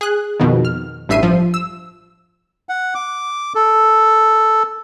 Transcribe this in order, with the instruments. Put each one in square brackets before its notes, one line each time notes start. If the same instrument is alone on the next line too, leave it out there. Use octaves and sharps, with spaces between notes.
[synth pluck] G#4 F#6
F2 B2 D#3
F6
A1 G2 E5 C7 D#7
F3
E6
[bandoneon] F#5
D6
A4